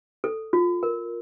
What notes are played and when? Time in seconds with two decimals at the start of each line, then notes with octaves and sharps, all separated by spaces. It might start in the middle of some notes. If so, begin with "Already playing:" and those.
0.24 A4
0.53 F4
0.83 A#4